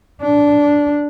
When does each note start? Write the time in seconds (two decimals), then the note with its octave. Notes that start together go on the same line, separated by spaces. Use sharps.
0.22 D4